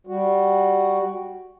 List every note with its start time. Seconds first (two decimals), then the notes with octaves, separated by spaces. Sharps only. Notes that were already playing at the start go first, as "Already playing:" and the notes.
0.07 G3 F#4